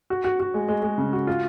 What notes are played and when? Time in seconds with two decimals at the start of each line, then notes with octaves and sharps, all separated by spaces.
0.10 F#4
0.24 F#4
0.40 F#4
0.54 G#3
0.68 G#3
0.83 G#3
0.98 C#3
1.13 F#4
1.27 F4